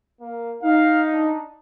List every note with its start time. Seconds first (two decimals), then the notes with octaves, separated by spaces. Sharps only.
0.21 A#3
0.63 D#4 F5
1.13 D4